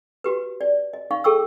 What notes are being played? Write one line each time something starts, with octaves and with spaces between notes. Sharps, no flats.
F#4 G4 B4
D5
D#5
D#4 F5 C#6
G#4 A4 G5 C#6 E6